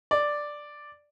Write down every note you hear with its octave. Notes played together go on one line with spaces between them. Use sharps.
D5